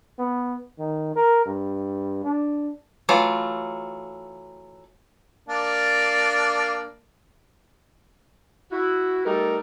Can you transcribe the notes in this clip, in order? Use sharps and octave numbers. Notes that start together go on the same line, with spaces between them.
B3
D#3
A#4
G2
D4
E3 F#3 A3 F4
A#3 D4 D5
E4 F#4
G3 A3 D#4 A4 A#4